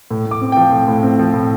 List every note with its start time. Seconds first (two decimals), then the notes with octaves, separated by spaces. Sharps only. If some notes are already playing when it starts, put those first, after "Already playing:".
0.11 A2
0.26 A2
0.31 D6
0.41 C4
0.52 F3 G5
0.72 A2
0.88 A2
1.03 C4
1.19 F3
1.34 A2